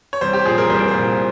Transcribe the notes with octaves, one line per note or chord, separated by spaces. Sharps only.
C#5
C2 C5
G4
A#2 F3 G#4
A#4
C2 C5
A#4
C5
A#2 F3